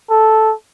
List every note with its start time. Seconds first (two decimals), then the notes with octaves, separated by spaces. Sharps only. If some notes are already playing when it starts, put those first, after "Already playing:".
0.10 A4